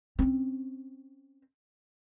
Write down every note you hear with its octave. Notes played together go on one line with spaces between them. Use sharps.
C4 C#4